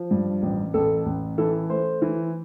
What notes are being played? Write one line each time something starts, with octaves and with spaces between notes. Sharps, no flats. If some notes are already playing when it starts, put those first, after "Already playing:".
Already playing: F3
G2
A1
A1 A4
A1
E3 A4
A3 C5
E3